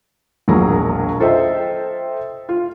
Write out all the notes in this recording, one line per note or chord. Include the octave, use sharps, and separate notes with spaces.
E1 A#1 F#3 G#4 A#4 A#5
F4 A4 C5 D#5 E5 G5
F4